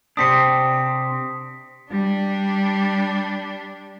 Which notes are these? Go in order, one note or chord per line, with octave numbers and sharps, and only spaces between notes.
C3 C4 D4 D#6 B6 C#7
G3 D4